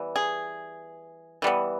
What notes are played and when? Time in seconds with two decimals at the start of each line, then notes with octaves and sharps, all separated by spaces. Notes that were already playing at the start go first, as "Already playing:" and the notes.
Already playing: E3 G3 B3
0.16 G#4
1.42 E3 G3 B3